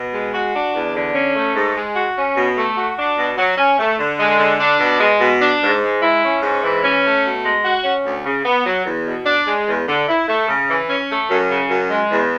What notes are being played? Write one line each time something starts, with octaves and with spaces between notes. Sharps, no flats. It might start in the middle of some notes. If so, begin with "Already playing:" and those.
Already playing: B2
G#3
F#4
D4
E2
D3
C#4
A3
G#2
G#3
F#4
C#4
B2
A3
F#4
D4
B2
F#3
C#4
A3
D3
G#3
D3
D4
B2
G#3
B2
D4
G#2
G#3
E4
C#4
G#2
E3
C#4
A3
B2
G#3
F#4
C#4
D2
C#3
B3
F#3
E2
B2
D4
G#3
E2
D3
E4
A3
C#3
E3
C#4
A3
F#2
C#3
F#2
G#3
E2